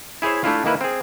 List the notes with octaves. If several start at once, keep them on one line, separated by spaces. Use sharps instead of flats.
E4 G#4 C5 C#5 E5
A3 D4 E4 F4
D#3 A#3 E4 B4
C4 G#4